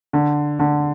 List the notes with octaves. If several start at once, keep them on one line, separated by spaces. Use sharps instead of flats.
D3
D3